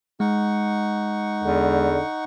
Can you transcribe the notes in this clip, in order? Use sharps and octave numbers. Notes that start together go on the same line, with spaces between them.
G#3 D#4 F#5 C#6
E2 D3